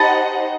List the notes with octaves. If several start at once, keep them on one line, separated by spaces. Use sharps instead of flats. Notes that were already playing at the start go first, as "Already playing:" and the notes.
Already playing: D#4 G4 C5 D#5 F#5 A5 B5